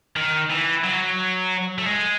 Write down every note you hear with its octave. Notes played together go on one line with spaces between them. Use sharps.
D#3
E3
F#3
A3
G#3